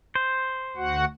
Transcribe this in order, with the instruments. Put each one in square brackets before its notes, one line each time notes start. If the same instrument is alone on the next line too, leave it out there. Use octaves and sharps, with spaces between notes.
[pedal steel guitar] C5
[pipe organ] D2 F#4 F#5